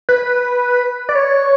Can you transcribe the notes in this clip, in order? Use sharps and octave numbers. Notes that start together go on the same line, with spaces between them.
B4
D5
C#5